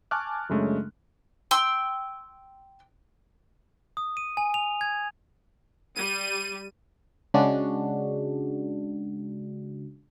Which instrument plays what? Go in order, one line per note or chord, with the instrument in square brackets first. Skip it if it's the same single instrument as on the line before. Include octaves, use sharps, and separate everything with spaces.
[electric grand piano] G#5 A5 C#6 D6 F6 F#6
F#2 C#3 G#3 A3 C#4 D4
[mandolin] G5 C6 E6
[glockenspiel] D#6
D#7
G#5
F7
G#6
[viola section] G3 [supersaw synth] D#7
[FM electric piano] C#3 G#3 D4 F#4